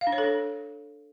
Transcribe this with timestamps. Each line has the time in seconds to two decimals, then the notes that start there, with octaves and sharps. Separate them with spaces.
0.01 F5
0.07 D4
0.12 C#5
0.18 A4
0.24 D4